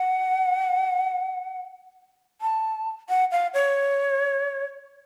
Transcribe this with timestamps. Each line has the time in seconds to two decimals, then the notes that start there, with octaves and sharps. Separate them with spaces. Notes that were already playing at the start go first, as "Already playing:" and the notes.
Already playing: F#5
2.41 A5
3.09 F#5
3.31 F5
3.54 C#5